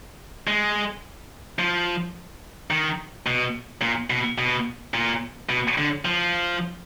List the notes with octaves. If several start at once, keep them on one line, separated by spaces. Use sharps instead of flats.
G#3
F3
D#3
B2
A#2
B2
B2
A#2
B2
D3
F3